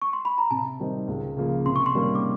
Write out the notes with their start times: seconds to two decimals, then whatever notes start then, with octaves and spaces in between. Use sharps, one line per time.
0.02 C#6
0.13 C6
0.25 B5
0.38 A#5
0.51 C3 A5
0.79 D#3 G3 C4 D#4
1.08 C#2
1.37 C#3 F3 A#3
1.65 C3 C6
1.76 C#6
1.86 C6
1.95 D#3 G3 A#3 C#4
2.15 D6